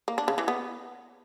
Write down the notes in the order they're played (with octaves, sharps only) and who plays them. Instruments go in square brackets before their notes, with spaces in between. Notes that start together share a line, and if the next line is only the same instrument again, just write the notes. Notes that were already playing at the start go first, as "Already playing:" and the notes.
[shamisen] A#3
D4
C#3
E3
B3